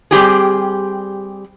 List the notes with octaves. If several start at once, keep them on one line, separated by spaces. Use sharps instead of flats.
G3 C4 G4 G#4